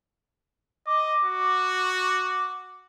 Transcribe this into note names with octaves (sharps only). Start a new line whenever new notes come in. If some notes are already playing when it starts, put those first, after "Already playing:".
D#5 D6
F#4